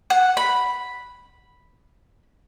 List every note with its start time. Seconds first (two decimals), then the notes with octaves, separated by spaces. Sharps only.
0.10 F#5
0.37 B5